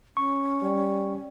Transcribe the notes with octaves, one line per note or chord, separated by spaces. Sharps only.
C#4 C#6
G3